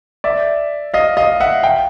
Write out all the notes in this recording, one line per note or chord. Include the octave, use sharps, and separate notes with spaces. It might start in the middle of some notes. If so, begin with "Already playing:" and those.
D5 E5
D#5 F5
D#5 F5
E5 F#5
F5 G5